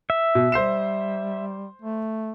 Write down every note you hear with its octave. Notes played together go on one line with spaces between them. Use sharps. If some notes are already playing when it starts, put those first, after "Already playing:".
E5
B2
G3 C5 C7 E7
A3